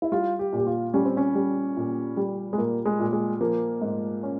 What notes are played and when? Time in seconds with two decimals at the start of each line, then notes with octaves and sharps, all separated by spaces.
0.02 E4
0.12 G3 F4
0.39 G4
0.53 A#2
0.58 G4
0.67 F4
0.94 G3 C#4
1.05 C4
1.17 C#4
1.35 G3
1.76 A#2
2.17 G3
2.53 G#3
2.58 A#2 A#3
2.85 G#3
2.99 A#2
3.13 G#3
3.41 F3 A#3
3.81 G#2
4.23 C#4